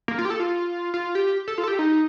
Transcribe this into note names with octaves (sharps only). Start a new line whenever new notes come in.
A#3
F4
G4
A4
F4
F4
G4
A4
F4
A4
G4
D#4